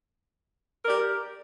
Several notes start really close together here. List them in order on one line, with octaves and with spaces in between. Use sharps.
A#4 D5 G4